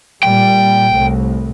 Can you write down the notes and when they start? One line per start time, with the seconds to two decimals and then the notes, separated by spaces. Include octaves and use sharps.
0.23 A#2 G3 G5
0.93 C2 A2